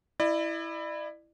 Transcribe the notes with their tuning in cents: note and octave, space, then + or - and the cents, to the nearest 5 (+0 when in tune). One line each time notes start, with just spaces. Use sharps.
E4 +0 D5 +40